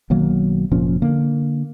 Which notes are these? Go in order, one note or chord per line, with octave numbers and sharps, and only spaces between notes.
B1 D#3 F#3 A#3
F1 A#2 F3 C#4
D3 A#3